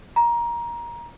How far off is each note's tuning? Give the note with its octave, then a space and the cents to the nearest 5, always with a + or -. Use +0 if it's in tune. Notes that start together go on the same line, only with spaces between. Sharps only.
A#5 +20